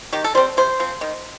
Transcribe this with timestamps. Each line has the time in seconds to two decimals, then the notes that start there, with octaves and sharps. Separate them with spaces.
0.13 D#3 G4
0.24 A4
0.35 G3 C4 C5
0.57 C3 C5
0.80 F3 C4
1.01 D#3